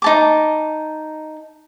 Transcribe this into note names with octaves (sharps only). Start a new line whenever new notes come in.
D#4 A5 D6